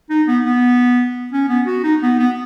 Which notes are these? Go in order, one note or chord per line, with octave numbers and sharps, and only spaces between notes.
D#4
B3
B3
C#4
B3
F#4
D#4
B3
B3